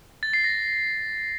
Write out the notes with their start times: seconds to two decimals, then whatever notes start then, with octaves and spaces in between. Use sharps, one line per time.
0.23 A6
0.33 C7
0.44 A#6